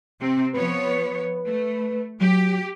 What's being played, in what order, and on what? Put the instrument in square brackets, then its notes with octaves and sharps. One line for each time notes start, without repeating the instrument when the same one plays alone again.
[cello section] C3 C4
[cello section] F3 B3 C#5 [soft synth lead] B4
[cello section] A3
[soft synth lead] F#3 [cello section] G4